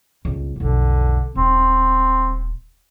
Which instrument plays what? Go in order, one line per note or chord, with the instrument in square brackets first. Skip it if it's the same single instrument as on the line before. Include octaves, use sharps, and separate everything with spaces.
[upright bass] G1 C#2
[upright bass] B1 F2 [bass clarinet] D3
[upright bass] D#1 [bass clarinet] C4